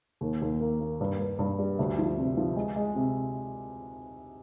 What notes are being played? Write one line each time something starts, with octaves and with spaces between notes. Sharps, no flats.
D#2
D#2
A#3
A#3
G2
G2
G2
G3
D2
F3
C3
F3
G#3
G#3
C3